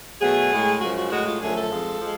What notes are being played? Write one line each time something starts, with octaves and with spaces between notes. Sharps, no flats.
B2 F#3 A3 G#4
A2 G#3
F#2 C#3 F3 G#3 F#4
F#4
A2 G#3 F#4
F4
F#2 D3 F3 A3 G#4
A4
F2 F3 G#3
F3 G#3